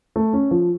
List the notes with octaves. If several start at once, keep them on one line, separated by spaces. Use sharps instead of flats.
A3
C#4
F3